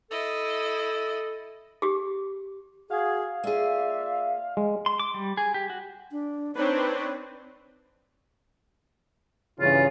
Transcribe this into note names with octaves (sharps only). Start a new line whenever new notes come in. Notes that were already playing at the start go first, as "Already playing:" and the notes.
E4 A4 D#5
G4 G#4
F#4 G#4 F5
A#3 F4 G#4 D5 E5
G#3
C6
D6
G3
G#4
G4
F#4
D4
C4 D4 D#4 B4 C#5
E2 G2 C#3 F4